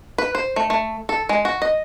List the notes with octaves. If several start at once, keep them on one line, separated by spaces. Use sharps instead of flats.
B4
C5
A3
A3
A4
G#3
F#4
D#5